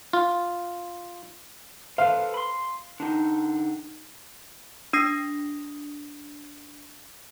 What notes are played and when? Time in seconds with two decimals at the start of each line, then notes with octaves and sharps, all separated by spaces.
0.13 F4
1.98 A4 B4 C5 F5
2.34 B5 C6
3.00 D3 D#4
4.93 D4 D#6 A#6 C7